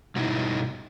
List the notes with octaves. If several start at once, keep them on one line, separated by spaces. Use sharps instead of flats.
G2 B2 D#4 E4